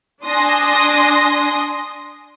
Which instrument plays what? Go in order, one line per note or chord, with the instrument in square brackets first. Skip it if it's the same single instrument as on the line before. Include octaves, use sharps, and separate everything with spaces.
[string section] D4 G#5 C6 D#6 A#6